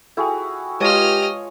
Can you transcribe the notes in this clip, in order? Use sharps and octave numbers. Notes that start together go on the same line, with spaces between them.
E4 F#4 G#4 A4 G5
G#3 F4 G4 B4 C#5 D#5 A5 F6